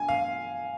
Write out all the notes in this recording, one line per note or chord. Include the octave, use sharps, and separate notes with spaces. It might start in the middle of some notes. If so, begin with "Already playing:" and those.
Already playing: G#5
F5